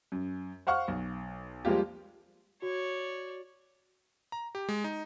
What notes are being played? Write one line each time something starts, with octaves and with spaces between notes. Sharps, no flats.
F#2
C5 F5 F#5 C#6 F6
B1
F3 G3 G#3 A#3 F4 G4
F#4 C#5 D5
A#5
G4
G#3
D#4